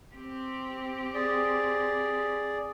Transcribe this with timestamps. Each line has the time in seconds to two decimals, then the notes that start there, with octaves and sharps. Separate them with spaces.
0.14 C4 G4
1.14 G#4 D5